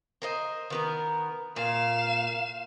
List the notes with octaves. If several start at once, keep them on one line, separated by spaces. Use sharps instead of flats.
A#4 C5 D#5
D#3 B3 A#4
A#2 F5 E7